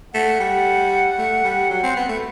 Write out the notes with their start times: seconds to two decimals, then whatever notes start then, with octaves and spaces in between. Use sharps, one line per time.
0.14 A3 F#5
0.40 G3
1.19 A3
1.44 G3
1.70 F#3
1.83 C4
1.96 B3
2.09 A3